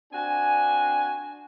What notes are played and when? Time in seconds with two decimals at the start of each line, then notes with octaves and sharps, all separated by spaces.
0.12 C4 D4 F#4 G#5